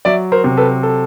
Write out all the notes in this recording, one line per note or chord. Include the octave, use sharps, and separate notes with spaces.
F#3 D5 E5
A#4 C5
C3
A4 B4
A4